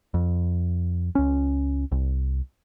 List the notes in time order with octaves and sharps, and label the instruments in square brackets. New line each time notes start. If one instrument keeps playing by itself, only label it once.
[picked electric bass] F2
C#2 C#4
C2